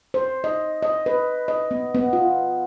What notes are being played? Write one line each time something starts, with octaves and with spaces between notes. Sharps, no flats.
C5
D#5
D#5
B4
D#5
B3
B3
F4